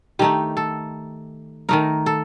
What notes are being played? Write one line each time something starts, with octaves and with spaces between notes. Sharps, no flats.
D#3 A3 D#4 G4
A4
D#3 A3 D#4 A#4
A4